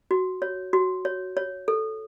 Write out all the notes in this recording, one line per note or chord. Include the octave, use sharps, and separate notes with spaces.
F#4
C#5
F#4
C#5
C#5
A4